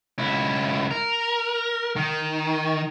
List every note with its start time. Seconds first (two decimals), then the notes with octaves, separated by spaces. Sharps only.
0.19 C#2 E4
0.91 A#4
1.96 D#3